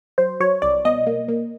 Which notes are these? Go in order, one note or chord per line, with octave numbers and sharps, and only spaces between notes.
F#3 C5
F#3 C#5
C2 D5
B2 D#5
A#3
A#3